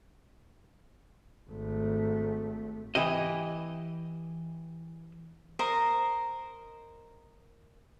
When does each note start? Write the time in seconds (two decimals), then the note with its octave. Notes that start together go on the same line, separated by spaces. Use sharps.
1.50 G#1 A3
2.95 E3 E4 G4 D#5
5.59 A#4 C5 D#5 A#5